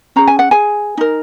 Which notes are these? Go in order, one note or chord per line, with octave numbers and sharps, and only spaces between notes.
C#4 G#4 A#5
G#5
F#5
G#4 G#5
D#4 A#4